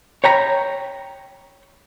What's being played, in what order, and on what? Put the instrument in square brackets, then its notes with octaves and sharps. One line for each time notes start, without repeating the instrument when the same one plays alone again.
[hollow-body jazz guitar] C#5 G5 A#5 B5